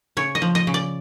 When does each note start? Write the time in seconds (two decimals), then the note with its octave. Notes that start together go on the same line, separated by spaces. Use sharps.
0.17 C#3 C#5
0.35 D#5
0.42 F3
0.55 D#5
0.67 C#3
0.74 D5